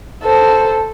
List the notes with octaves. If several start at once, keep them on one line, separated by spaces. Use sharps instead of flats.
A4 C5